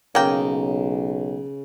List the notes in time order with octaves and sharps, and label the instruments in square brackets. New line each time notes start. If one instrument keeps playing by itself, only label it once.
[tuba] B1 [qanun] C#3 D#5 [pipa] A#3 G5